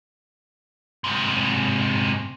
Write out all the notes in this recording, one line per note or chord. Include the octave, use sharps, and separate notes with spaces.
G#2 C3